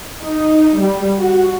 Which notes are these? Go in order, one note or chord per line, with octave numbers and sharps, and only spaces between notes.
D#4
G3
F#4